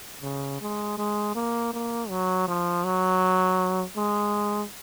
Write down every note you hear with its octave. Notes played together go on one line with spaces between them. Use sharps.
C#3
G#3
G#3
A#3
A#3
F#3
F3
F#3
G#3